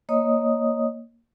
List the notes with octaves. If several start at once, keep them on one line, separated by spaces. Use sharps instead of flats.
A#3 C#5 D#5 D#6